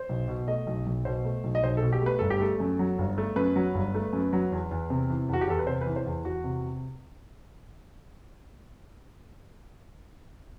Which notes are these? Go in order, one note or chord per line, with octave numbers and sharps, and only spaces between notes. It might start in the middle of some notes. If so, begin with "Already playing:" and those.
Already playing: C5
B1
B2
A3 D#5
B1
B1
B2 C5
A3
B1
D#5
B1 C5
A4
B2
G4
A3 B4
G1 A4
G4
A3 A4
F#2
F#3
G1
A3
F#2 B4
F#3
G1
A3
F#2
F#3
E2
E2
C3
E3
E2 F#4
G4
E2 A4
B4
C3 C5
B4
E3
C5
E2
E2 F#4
C3